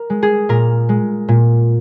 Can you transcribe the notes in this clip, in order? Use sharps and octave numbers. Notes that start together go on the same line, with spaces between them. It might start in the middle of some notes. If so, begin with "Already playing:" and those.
Already playing: A#4
G#3
G#4
A#2 A#4
G#3
A#2